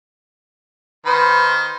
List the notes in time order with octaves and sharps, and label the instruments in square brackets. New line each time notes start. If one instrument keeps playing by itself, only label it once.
[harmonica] D#3 C5 [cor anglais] B4